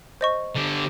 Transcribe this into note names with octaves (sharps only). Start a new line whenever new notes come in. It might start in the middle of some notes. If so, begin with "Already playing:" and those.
C5 D#5 C#6
D3 G4